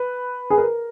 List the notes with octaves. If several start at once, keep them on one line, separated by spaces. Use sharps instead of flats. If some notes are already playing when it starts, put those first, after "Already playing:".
Already playing: B4
G#4
A#4